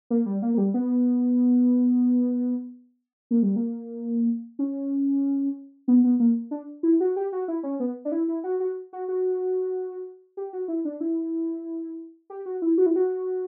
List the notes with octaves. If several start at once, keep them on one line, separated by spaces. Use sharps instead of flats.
A#3
G3
A#3
A#3
G3
B3
A#3
G3
A#3
C#4
B3
B3
A#3
D4
E4
F#4
G4
F#4
E4
C#4
B3
D4
E4
E4
F#4
F#4
F#4
F#4
G4
F#4
E4
D4
E4
G4
F#4
E4
F#4
E4
F#4